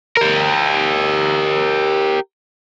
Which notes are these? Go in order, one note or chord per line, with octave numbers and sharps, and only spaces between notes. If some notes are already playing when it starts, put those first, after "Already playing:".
G4 A#4